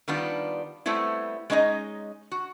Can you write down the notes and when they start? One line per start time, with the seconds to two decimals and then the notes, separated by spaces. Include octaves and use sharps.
0.08 D#3 G3 B3 D4 F4
0.86 G3 A3 B3 C4 E4
1.50 G#3 C#4 D#4 D#5 A#5
2.31 F#4